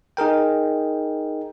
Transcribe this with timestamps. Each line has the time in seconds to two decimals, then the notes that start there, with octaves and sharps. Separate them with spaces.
0.17 D#4 G#4 A#4 G5